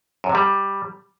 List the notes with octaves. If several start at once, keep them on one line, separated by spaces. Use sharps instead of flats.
F#2
C3
G3